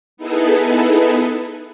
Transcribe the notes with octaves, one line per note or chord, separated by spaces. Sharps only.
B3 D#4 E4 G#4 A4 B4